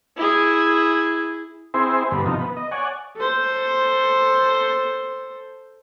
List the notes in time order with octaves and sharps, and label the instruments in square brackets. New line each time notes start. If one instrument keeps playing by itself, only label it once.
[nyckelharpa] E4 G#4
[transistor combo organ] C4 E4 G#4 C5
G2 D3 B3
C3 F3 D#4
B3
D#5
C#5 D5 F#5 G#5
[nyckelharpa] A4 C5